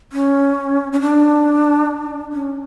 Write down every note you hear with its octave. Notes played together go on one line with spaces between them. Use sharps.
C#4
C#4
D4
C#4